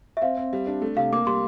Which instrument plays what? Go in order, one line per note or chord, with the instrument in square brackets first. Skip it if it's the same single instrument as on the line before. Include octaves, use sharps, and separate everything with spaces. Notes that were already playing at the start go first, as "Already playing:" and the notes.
[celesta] E5
[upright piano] C4 [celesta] F5
[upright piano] C4
G3
D4
A3
[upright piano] C3 [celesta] F5
[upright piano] A#3 [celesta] D6
[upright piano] G3 [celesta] C6